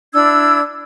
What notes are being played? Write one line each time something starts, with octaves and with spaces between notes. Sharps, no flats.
D4 E4 E6 G#6